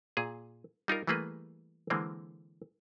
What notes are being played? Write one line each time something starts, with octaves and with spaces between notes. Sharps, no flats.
A#2 G#4
G3 D#4 F4 A#4
E3 G3 A3 A#3 G#4 B4
D3 E3 G#3 A#3 C4